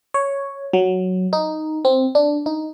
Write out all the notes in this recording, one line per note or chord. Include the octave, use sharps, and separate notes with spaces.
C#5
F#3
D#4
C4
D4
D#4